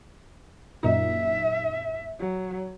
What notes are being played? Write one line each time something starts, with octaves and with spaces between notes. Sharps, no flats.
F#2 A#2 D#4 E5
F#3